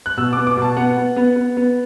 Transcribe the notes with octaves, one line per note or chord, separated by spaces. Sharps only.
F#6
B2 E6
B3 D6
D6
B2 A5
B3 F#5
B3
B3
B3
B3